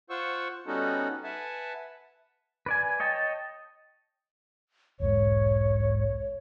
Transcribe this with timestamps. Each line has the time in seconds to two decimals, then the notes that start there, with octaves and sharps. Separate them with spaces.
0.10 F4 C5 F#5 C#6 E6
0.67 G3 B3 C#4 D#4 F#4 A4
1.24 B4 E5 F#5 G#5 A5
2.66 B4 D5 G#5
3.00 C#5 D#5 G5 A5
5.00 E1 B1 G#2 C#5